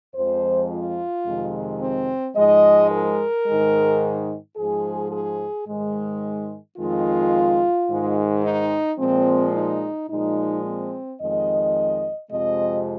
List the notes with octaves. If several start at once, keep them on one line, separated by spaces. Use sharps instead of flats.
F2 F3 G#3 C5
F4
F2 C3 D#3 G#3
C4
G#2 F3 G#3 D#5
A#4
G#2 D#3 G#3
G#2 F3 G#3 G#4
G#4
G#2 D#3 G#3
F2 D#3 G#3 F4
G#2 D#3 G#3
D#4
A#2 F3 G#3 C4
D#4
A#2 F3 G#3 D#4
C4
F2 D#3 G#3 D#5
F2 C3 F3 G#3 D#5